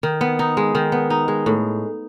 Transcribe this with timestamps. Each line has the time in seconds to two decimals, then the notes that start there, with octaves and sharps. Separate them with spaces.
0.03 D#3
0.21 B3
0.39 D#4
0.57 G#3
0.75 D#3
0.92 B3
1.10 D#4
1.28 G#3
1.46 A2